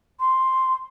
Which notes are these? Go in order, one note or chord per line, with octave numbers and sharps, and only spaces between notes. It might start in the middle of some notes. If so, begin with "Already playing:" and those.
C6